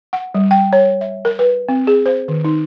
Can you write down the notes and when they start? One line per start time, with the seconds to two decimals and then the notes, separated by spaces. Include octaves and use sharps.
0.13 F#5
0.35 G3
0.51 G5
0.73 C#5
1.01 E5
1.25 A#4
1.39 B4
1.69 C4
1.87 G#4
2.06 C5
2.28 D#3
2.45 D#4